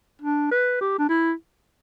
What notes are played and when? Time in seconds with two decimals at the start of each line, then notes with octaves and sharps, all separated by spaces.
0.22 D4
0.51 B4
0.81 G4
0.99 D4
1.09 E4